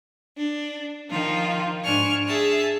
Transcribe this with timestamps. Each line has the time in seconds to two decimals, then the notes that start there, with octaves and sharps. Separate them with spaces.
0.36 D4
1.09 D#3 F3 D#4 F4
1.82 G#2 D4 G#5 C#6 F6
2.26 G#4 E5 A5